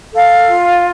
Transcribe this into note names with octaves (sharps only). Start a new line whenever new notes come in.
A4 F5
F4